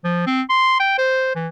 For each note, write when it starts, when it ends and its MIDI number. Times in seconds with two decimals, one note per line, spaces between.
0.05 0.25 53
0.27 0.42 60
0.50 0.75 84
0.80 0.97 79
0.98 1.31 72
1.36 1.48 52